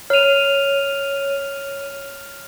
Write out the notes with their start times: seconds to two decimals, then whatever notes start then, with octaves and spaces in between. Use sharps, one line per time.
0.10 C#5 F6 D#7 F7